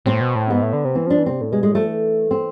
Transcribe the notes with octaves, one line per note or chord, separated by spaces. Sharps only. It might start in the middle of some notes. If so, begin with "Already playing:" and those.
A2 C4
B2
A2
G#2 B3
A2
D3
C3
E3 C4
F3 D4
E3
C3 C4
A2
B2 G#3
A2 G#3
F3 A3
E3
C4